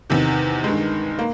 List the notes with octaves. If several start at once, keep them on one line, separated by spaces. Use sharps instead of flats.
E2 C3 D#3
G2 D#3 G#3
A#3